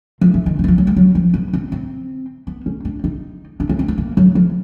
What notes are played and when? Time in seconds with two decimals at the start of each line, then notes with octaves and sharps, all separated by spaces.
0.21 F3
0.34 E3
0.46 D#3
0.59 D#3
0.64 E3
0.68 F3
0.78 F#3
0.87 G3
0.96 F#3
1.15 F3
1.34 B3
1.53 C4
1.72 C4
2.47 B3
2.66 C#4
2.85 D4
3.04 D#4
3.60 D4
3.69 C#4
3.79 C4
3.88 B3
3.98 A#3
4.17 F#3
4.35 F3